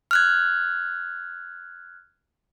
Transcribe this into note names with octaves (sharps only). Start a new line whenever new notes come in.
F6 F#6 G#6